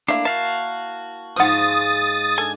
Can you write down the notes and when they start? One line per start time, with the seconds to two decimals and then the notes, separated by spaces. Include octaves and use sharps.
0.08 A3 A#3 D4 E4 E5 F5
0.25 F#4 E5 F5 A5
1.36 G#2 F3 G#3 F4 F#5 D#6 A6
2.38 D4 A4 G#5